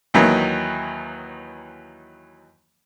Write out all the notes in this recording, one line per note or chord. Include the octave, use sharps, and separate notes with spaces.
D#2 D#3 E3 F#3